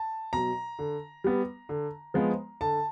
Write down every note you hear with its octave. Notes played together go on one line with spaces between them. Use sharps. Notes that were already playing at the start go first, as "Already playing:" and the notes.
Already playing: A5
B2 F#3 A#5
D3
G3 B3
D3
F3 G#3 B3
D3 A5